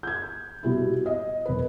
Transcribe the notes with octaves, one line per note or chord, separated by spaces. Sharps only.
G6 G#6
B2 G3 E4
D#5
E1 B4